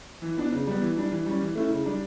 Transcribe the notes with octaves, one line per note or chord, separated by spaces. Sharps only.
E3
B3 D4
C#3
G3 B3
E3
G3 D4
E3
G3 C#4
E3
A3 C#4 E4
C#3
G3 D4